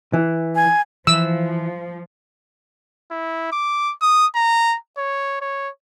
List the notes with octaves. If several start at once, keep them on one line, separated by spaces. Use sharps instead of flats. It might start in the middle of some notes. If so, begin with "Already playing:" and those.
E3
G#5
E3 F3 E6
E4
D6
D#6
A#5
C#5
C#5